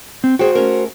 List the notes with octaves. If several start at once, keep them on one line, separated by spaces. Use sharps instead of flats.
C4
F#4 G#4 C5 G5
A3 C#4 A#4